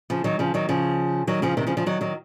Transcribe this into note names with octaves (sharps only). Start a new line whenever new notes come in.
C#3 F3
D#3 F#3
C#3 F3
D#3 F#3
C#3 F3
D#3 F#3
C#3 F3
C3 D#3
C#3 F3
C#3 F3
D#3 F#3
D#3 F#3